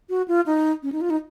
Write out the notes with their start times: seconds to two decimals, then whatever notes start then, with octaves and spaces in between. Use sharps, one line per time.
0.09 F#4
0.28 F4
0.46 D#4
0.83 C#4
0.92 D#4
1.01 F4
1.10 D#4